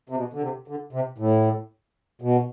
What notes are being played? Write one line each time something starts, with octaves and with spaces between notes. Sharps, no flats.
C3
B2
D3
C3
D3
C3
A2
B2